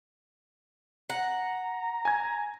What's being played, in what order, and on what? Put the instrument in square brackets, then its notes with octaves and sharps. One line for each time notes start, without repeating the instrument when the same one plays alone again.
[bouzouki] F#5 [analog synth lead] A#5
[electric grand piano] G#5 G#6